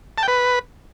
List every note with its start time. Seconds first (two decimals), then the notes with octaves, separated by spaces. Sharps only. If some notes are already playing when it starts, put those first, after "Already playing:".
0.18 A5
0.23 G5
0.28 B4